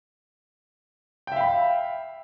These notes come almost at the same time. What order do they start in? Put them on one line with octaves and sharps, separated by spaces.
G5 E5 F5 B5